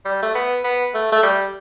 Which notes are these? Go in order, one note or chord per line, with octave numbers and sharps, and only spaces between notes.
G3
A3
B3
B3
A3
A3
G3